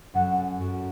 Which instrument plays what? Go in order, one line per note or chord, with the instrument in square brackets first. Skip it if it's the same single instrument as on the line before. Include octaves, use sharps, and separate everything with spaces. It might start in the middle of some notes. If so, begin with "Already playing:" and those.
[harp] F#2 F#3 C#4 F#4 A4 [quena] F#5
[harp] F#2 F#3 C#4 F#4 A4